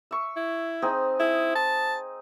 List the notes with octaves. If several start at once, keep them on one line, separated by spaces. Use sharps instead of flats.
E5 C#6
E4
C4 D#4 G#4
E4 G#4
A5